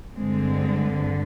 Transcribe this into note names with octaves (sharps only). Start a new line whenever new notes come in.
G2 D3 G#3 C4